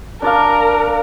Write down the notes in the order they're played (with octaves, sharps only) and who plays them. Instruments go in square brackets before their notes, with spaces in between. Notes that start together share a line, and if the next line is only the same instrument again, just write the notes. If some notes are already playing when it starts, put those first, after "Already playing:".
[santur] D4 D5 F5 [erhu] A#4